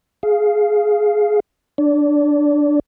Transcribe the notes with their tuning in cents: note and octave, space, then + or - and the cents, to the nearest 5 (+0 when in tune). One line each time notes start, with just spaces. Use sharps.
G#4 +10 F5 +0
D4 +5 D5 -25